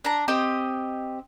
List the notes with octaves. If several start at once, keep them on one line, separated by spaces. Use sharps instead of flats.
D4 A#5
C4 G4 D#5